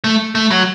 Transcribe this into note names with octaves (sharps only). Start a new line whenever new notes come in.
A3
A3
F#3